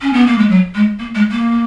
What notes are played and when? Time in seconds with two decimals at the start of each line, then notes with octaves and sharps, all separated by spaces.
0.01 C#4
0.13 B3
0.26 A#3
0.38 G#3
0.49 F#3
0.75 G#3
0.99 A#3
1.15 G#3
1.31 A#3